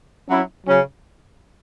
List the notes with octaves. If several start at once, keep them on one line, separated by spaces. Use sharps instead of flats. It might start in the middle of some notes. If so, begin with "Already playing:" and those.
F#3 C#4 E4
C#3 F#3 C#4